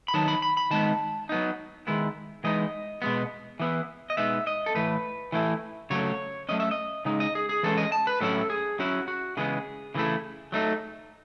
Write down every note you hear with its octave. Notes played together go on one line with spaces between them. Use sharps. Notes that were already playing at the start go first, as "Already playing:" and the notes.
B5
D#3 F#3 B3 D#4 A5
B5
B5
B5
D#3 G#3 B3 A5
F#3 B3 D#4
D#3 G#3 B3 E4
E3 G#3 B3 D#4 D#5
B2 G#3 B3
E3 B3 E4
D#5
B2 G#3 B3 D#4 E5
D#5
A4
A2 E3 A3 B4
E3 A3 E4
C#3 F#3 A3 C#5
F#3 A3 C#4 D#5
E5
D#5
C#3 G#3 D#4
D#5
G#4
G#4
E3 G#3 C#4 A4
D#5
A5
B4
A2 F#3 C#4 E4 A4
G#4
F#3 C#4 E4 F#4
F#4
C#3 E3 G#3 B3 G#4
C#3 E3 A3 E4
F#3 A3 D#4